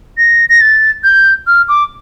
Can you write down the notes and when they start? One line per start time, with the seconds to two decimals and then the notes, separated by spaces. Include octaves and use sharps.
0.18 A#6
0.49 A#6
0.61 A6
1.04 G6
1.47 F6
1.69 D6